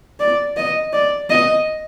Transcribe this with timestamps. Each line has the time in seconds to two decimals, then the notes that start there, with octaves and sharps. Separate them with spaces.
0.20 D5
0.57 D#5
0.93 D5
1.30 D#5